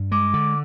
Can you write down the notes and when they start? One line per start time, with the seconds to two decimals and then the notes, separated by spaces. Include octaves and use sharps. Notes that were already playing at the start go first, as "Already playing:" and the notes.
Already playing: G2
0.12 G#3 D6
0.34 D3